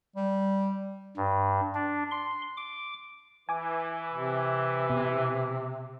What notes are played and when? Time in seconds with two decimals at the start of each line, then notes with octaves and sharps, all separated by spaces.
0.16 G3
1.17 G2
1.75 D4
2.11 C6
2.57 D6
3.49 E3 G#5 D6
4.13 C3
4.90 B2